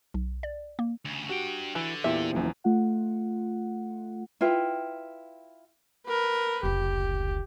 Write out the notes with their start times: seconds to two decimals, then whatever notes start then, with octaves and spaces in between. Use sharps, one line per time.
0.14 B1
0.43 D5
0.79 A#3
1.05 D2 C#3
1.29 D4 F#4 G4 G5
1.75 D3 E3
2.04 E2 A#2 G4 E5
2.32 F#1 E2 F3
2.64 A3 F4 F#5
4.41 E4 F4 B4 G5
6.07 A#4 B4
6.63 F1 C#2 G4